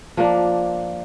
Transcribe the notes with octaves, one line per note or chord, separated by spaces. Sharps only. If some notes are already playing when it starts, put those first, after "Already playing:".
F3 A#3 D4